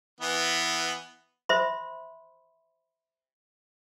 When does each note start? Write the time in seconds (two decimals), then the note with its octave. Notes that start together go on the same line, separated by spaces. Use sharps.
0.20 E3 B3
1.49 C5 E5 B5 C6